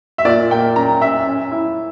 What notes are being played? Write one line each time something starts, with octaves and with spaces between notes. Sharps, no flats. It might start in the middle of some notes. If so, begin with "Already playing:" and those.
E5
A#2 D5
A#3 G5
C#4 A#5
C#4 E5
C#4
E4